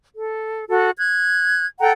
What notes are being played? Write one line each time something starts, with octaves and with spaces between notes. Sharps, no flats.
A4
F#4 A4
F#6 G#6
A4 F#5 G5 A#5